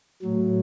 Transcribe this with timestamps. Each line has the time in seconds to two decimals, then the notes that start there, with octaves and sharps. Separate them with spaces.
0.22 A2 F#3